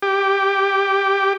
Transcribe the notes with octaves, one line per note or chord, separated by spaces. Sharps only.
G4